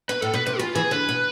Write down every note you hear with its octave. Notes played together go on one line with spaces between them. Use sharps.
B2 B4
A2 A4
B2 B4
C3 B4
E3 F4
E3 G#4
D3 B4
B2